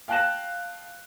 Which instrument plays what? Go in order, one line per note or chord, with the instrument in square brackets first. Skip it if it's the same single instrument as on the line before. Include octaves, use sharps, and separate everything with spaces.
[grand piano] F5 G5 A5 F#6 A#6 E7